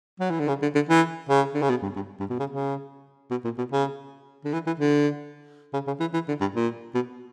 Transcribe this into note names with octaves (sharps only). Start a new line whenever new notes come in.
F#3
E3
D3
C#3
D3
D3
E3
C#3
D3
C#3
B2
G2
G2
G2
B2
C#3
C#3
B2
A#2
B2
C#3
D3
E3
E3
D3
C#3
C#3
E3
E3
D3
G2
A#2
B2